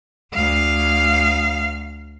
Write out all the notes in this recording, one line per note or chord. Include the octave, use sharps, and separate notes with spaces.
D2 F5